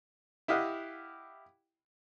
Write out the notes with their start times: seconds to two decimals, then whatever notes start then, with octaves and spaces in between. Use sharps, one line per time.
0.48 E4 G4 D#5 F5 F#5